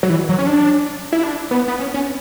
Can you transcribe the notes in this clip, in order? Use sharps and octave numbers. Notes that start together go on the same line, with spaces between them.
F#3
E3
F#3
C#4
D4
E4
D4
B3
B3
C#4
C#4